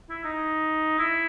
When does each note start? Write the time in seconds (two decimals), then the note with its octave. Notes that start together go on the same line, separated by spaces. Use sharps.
0.10 E4
0.25 D#4
0.99 E4